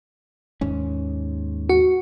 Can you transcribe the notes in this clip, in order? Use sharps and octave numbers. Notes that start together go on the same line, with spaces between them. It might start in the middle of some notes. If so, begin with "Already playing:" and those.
D#2 G#2 C#4
F#4